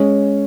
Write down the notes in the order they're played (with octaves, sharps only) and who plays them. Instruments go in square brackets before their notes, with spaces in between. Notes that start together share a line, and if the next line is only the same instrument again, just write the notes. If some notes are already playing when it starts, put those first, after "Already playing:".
Already playing: [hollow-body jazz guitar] G#3 [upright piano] C#4